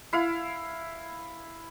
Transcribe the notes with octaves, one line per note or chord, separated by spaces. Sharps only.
E4 F5